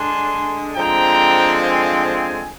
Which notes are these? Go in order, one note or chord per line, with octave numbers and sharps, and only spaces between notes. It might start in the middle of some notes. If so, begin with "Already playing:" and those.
Already playing: D3 G#3 D4 G#5 C6
D3 F3 G#3 C4 G5 A#5
F5 G#5
F5 G#5